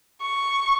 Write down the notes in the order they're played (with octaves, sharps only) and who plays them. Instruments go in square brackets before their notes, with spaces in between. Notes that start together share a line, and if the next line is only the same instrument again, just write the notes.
[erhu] C#6